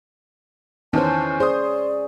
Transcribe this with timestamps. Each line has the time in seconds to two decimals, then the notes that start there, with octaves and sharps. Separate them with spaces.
0.93 E2 D#3 E3 C#4 C5 A5
1.40 G#4 C5 D5 D#6